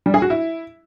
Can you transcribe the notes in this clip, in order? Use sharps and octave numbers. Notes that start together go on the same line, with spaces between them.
G3
G#4
F#4
E4